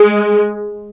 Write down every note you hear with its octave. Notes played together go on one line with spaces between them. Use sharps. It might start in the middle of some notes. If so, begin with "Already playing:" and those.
Already playing: G#3